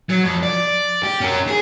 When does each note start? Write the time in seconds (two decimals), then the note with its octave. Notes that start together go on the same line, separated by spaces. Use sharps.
0.10 F#3
0.25 F2
0.43 D5
1.03 G4
1.21 C#4 A#4
1.48 G#4